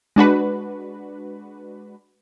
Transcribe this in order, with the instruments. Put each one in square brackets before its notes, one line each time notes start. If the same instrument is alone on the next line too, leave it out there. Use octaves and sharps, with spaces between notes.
[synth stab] G#3 D4 F#4 B4